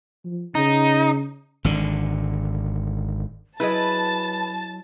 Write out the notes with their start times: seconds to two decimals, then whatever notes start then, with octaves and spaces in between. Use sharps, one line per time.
0.25 F3
0.55 C#3 D#4
1.65 G#1 D3
3.60 F#3 E4 G#4 B4 D#5 A5